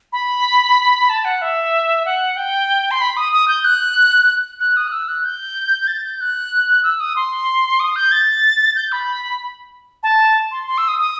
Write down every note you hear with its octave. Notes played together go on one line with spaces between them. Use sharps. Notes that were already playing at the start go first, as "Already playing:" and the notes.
B5
A5
F#5
E5
F#5
G5
C6
B5
D#6
D#6
G6
F#6
F#6
D#6
F#6
E6
F#6
G6
A6
G6
F#6
E6
D#6
C6
D#6
G6
A6
G6
B5
A5
C6
C6
E6
D#6
D#6